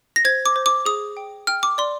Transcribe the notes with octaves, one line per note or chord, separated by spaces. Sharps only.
A#6
C5 G#6
D6
C5
D6
G#4 D#6
G5
G5 F6
D6
D5 C6